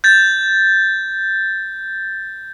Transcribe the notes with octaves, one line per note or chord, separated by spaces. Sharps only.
G6 A6